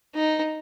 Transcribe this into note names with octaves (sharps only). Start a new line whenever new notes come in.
D#4